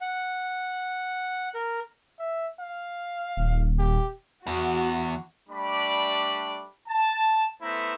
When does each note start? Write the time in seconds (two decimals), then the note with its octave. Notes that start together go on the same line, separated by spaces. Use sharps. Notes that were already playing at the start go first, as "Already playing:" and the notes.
0.01 F#5
1.55 A#4
2.19 E5
2.60 F5
3.37 D#1
3.79 G4
4.47 E2 F#4
5.50 G3 A3 D4 D5 B5
6.89 A5
7.62 A3 B3 E4 B4 C5 A#5